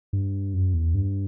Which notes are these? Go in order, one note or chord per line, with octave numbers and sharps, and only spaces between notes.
G2
F#2
E2
G2